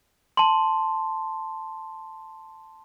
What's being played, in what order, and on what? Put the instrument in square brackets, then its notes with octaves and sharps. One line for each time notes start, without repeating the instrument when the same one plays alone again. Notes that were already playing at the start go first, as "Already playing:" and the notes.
[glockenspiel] A5 C6